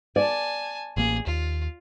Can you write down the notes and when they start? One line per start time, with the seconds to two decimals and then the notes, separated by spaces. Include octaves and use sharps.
0.16 D5 G#5 A5
0.97 A1 A#3 G#4
1.27 D#2 F4